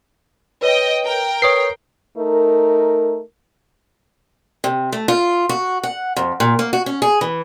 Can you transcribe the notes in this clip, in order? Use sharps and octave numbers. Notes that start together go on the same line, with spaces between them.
B4 C#5 D#5 G5
A#4 G5
B4 C#5 D#6 C7
A3 D#4 A#4
C3
A3
F4
F#4
F#5
F2
A#2
A#3
F#4
C#4
G#4
E3